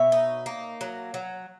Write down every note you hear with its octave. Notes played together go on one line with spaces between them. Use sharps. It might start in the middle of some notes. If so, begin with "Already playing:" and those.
Already playing: B2 C#5 E5
D#4
A#3
F#3
F#3